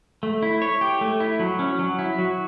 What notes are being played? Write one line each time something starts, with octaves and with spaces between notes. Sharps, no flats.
A3
E4
C#5
G4
A3
E4
F#3
C#4
F#3
E4
F#3